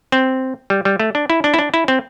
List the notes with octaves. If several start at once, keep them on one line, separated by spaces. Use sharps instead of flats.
C4
G3
G3
A3
D4
E4
D4
E4
D4
E4
C4